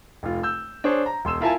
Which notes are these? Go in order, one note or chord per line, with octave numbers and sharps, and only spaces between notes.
F1 F4
E6 G6
D4 G#4 C5 C#5
A#5
E1 C6 E6 E7
E4 F4 A#4 E5 G#5 A5